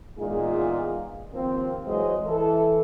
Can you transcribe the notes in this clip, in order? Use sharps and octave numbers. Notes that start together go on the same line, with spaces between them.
E2 A#2 G#3 D#4 F4 G#4
D#2 F3 A#3 C4
E3 F#3 G#3 G#4 C5 D#5
E3 A4